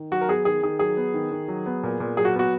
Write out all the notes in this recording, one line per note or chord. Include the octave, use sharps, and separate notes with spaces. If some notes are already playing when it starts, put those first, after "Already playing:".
Already playing: D#3
F#3 F#4
A#4
B3 G#4
D#3 G#4
D#3 G#4
F#3 G#4
B3
D#3
D#3
F#3
B3
A#2
A#2
F#3 G#4
F#4
B3 F#4